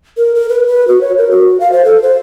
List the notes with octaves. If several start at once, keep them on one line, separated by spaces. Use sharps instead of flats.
A#4
A#4
B4
B4
F#4
C#5
A#4
F#4
F5
C5
A4
C5